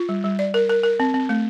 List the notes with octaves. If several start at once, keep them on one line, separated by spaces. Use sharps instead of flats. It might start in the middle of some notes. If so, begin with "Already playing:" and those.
Already playing: F4
G3
G3
D5
A#4
A#4
A#4
C4
C4
A3